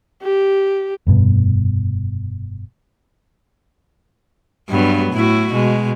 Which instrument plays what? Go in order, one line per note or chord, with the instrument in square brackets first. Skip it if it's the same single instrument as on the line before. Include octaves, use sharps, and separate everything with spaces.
[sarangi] G4
[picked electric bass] F1 G2 B2
[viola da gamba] G2 F#3 B3
A2 E4 F#4
B2 G#3